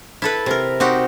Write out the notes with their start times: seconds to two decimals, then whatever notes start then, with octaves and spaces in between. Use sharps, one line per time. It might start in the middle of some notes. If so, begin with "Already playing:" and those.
0.22 E4 A4 B4
0.46 C3 A#4
0.80 C4 D#4 F#4 G4